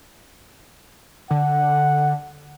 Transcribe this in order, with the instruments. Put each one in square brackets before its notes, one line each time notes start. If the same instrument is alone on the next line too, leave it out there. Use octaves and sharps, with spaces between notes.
[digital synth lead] D3 [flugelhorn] F#5